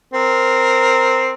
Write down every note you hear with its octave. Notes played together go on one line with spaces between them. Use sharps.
C4 A#4